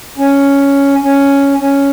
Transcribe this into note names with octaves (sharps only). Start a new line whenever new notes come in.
C#4
C#4
C#4